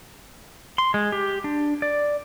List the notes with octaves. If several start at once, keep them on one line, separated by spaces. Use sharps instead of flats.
C6
G#3
G4
D4
D5